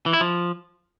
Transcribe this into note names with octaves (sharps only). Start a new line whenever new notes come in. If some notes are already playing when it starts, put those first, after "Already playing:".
E3
E4
F3